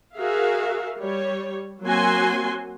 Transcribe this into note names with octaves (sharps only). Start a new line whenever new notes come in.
F#4 G#4 A#4 E5 F5
G3 C#5
F#3 A#3 C4 F#4 G#5 C6